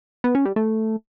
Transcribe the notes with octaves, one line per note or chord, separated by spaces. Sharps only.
B3
C#4
G3
A3